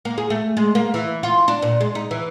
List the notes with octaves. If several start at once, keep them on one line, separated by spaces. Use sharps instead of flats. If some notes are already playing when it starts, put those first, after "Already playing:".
A#3
G#4
A3
G#3
A#3
E3
F4
D4
A#2
G#3
D#4
E3